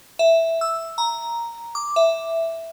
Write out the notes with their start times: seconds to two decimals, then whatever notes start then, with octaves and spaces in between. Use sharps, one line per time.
0.19 E5
0.61 E6
0.98 A#5
1.75 D6
1.96 E5